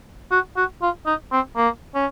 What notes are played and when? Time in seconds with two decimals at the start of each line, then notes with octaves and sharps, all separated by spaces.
0.31 F#4
0.56 F#4
0.82 F4
1.06 D#4
1.32 C4
1.57 A#3
1.94 C#4